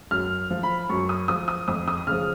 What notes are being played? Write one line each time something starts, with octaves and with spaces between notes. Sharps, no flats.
F#2 F6
F3
B5
F#2 C#6
D#6
F3 D#6
D#6
F2 D#6
D#6
C#3 F3 F6